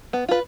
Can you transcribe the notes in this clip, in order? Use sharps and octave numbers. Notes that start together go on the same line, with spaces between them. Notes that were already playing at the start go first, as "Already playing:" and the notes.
B3
F4 B4